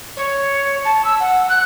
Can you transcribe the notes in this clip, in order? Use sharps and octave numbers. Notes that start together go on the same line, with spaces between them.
C#5
A5
E6
F#5
F#6